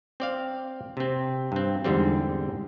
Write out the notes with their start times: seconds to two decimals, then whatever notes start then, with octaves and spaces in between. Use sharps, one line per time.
0.20 C4 D5 F5
0.97 C3 C4
1.52 G2 C4
1.84 E2 G#2 D3 G3 C4